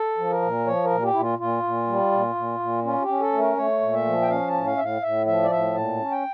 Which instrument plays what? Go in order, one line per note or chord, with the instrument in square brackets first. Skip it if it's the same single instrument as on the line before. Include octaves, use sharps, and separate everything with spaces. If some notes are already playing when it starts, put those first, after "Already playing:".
Already playing: [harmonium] A4
F3
A#4
A#2
F3 C#5
A#4
A#2
G4
A#2 E4
F4
A#2 F4
A#2
G3
A#2
A#2
A#2
C#4 F4
G4
C#4
A4
A3
A#4
A3 C#5
A#2
E5
F3
G5
C#4 F5
A5
A2
F5
A2 E5
F5
A2 E5
F3 E5
D5
A2 E5
A#2 A5
C#4
G5